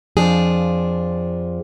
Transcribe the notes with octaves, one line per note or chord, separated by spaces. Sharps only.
F2 F3 D4 G#4